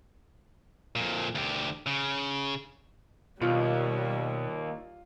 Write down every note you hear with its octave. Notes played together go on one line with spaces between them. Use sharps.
F2 A#2
D2 G4
C#3
D#2 B2 G3 F4